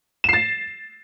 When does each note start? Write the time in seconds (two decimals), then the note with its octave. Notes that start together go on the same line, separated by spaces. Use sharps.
0.24 E7
0.29 C7
0.33 A6